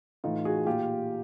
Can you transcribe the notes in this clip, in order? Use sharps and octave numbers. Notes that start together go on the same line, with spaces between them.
A2 E3 D#4 F4
F#4 G#4
A#2 F4 G4